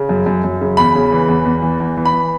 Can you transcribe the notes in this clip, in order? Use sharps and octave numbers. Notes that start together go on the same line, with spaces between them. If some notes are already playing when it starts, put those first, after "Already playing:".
Already playing: C#3
F#2
F#2
F#2
C#3
E2 B5
C#3
E3
E2
E2
E3
E2
E3
B5
E3